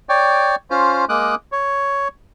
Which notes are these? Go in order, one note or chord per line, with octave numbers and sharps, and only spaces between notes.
C#5 D5 G5
C#4 F4 C5
G#3 A#3 D6 D#6 F#6
C#5